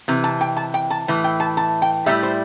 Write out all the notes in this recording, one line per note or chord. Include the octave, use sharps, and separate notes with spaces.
C3 E3
A5
G5
A5
G5
A5
A2 E3
G5
A5
A5
G5
A2 G3 E4 E5
C5